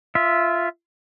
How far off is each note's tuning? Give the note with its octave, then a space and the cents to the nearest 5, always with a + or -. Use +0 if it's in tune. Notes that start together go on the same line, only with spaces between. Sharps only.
F4 -15 E5 +0